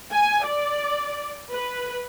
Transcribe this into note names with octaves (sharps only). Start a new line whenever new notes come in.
G#5
D5
B4